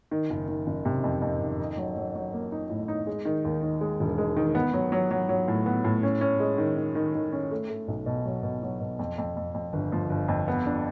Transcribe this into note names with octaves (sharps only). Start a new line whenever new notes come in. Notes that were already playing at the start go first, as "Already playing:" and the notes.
D#3
F#1
D#3
F#1
C3
F2
F2
D#3
D#4
F#3
F#3
F#3
A#3
D#4
A2
D#4
G#3
D#3
D#2
D#3
G#3
E1
G#3
D#3
B3
F#3
F#3
F#3
F#3
A2
B3
A2
C#4
C#4
G#3
D#3
D#3
D#3
D#3
C#4
A3
A3
B1
B2
F#3
B2
F#3
B2
F2
F2
F2
F2
G1
F3
G1
F2
B3
D4